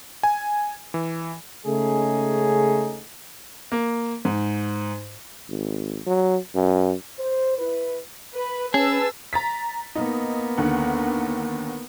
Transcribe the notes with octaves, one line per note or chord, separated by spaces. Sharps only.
G#5
E3
C#3 G#3 A3 C#4 D#4 G#4
A#3
G#2
G#1
F#3
F#2
C5
E4 B4
B4
C#4 G#4 B4 A5 E6
A#5 A6 B6
A#3 B3 D#4
D#2 D3 F#5